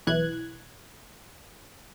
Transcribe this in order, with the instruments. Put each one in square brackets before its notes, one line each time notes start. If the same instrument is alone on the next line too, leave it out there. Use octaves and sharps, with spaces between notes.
[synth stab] B1 E3 F#6 G#6